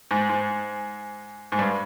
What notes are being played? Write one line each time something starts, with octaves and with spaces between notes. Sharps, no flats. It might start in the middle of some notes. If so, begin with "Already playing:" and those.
G#2
G#2
G#2
G2